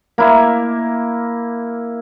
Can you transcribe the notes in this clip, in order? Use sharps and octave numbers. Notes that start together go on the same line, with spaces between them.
A#3 E4